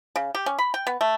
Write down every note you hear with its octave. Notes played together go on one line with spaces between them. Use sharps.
C#3
G4
C#4
B5
G5
B3
A3